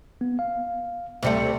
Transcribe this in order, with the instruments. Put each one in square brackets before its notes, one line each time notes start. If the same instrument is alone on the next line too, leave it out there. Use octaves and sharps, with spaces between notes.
[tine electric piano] B3
F5
[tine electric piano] D2 C#7 [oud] C3 G3 A3